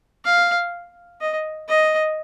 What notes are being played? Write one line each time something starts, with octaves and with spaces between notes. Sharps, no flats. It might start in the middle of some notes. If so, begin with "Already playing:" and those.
F5
D#5
D#5